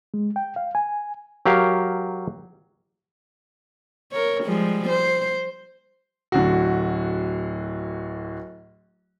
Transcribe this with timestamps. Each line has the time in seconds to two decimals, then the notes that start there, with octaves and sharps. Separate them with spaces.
0.14 G#3
0.36 G5
0.56 F5
0.75 G#5
1.46 F#3 G4 A#4 F5
4.12 A#4 C#5
4.43 F3 G3 G#3
4.89 C5
6.32 D1 D3 F#4